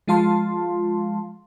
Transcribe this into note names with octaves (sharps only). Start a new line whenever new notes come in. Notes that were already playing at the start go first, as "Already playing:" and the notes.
F3 G#3 F4 F5 A5 C6